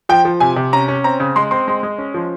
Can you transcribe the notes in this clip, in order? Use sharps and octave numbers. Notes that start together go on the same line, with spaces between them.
F3 G5
F3
C3 G#5
C3
C#4 A#5
C#4
C4 A#5
C#3
G#3 C6
C4 C6
G#3
G#3
C#4
F3